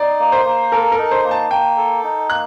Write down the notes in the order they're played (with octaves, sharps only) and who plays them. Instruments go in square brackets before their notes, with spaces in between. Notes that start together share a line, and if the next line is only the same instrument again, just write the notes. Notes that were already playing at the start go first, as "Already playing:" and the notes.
Already playing: [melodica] D#4 [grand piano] D5
[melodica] A#3
[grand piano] C5
[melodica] A#3
[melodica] A4 [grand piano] A#4
[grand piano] A#4
[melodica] D#4
[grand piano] C5
[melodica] A#3
[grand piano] A5
[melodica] A#3 [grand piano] G5
[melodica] A4
D#4
[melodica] A#3 [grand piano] F#6